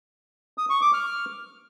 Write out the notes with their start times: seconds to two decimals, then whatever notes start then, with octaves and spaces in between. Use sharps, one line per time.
0.58 D#6
0.70 C#6
0.81 D6
0.93 F6